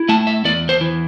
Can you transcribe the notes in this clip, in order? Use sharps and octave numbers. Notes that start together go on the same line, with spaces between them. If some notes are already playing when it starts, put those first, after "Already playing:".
Already playing: E4
A3 A5
E5
E2 D5
C5
E3